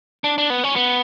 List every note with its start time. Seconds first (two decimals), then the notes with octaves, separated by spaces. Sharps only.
0.24 D4
0.38 D4
0.50 B3
0.64 C#4
0.76 B3